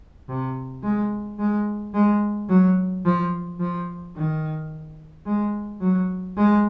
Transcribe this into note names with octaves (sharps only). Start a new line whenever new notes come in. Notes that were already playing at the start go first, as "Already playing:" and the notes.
C3
G#3
G#3
G#3
F#3
F3
F3
D#3
G#3
F#3
G#3